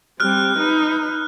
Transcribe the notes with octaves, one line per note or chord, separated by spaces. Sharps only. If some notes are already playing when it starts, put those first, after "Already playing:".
G3 C4 F6 F#6
D#4 B4